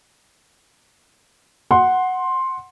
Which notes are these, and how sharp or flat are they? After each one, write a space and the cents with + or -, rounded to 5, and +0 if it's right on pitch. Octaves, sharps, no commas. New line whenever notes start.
F#5 +0 C6 +10